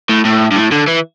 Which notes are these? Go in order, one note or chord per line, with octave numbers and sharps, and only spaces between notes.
A2
A2
G2
A2
D3
E3